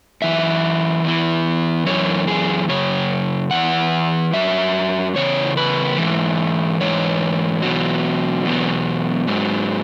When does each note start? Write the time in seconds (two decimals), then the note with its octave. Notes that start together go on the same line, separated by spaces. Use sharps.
0.22 F#2 E3 E5
1.04 E2 E3
1.86 F#2 E3 C#5
2.27 G#4
2.69 F#2 C#3 C#5
3.51 E2 E3 F#5
4.33 F#2 F#3 E5
5.16 E2 C#3 C#5
5.57 B4
5.98 G#2 E3
6.81 G#2 E3 C#5
7.62 E2 B2 F#3
8.45 E2 B2 F#3
9.27 G#2 F#3